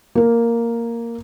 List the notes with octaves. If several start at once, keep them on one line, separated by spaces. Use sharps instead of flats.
A#3 A#4